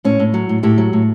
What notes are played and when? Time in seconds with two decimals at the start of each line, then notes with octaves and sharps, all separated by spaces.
0.04 A2 C#4
0.19 A2
0.34 F#3
0.49 A2
0.63 A2 E4 G4
0.78 F#3
0.93 A2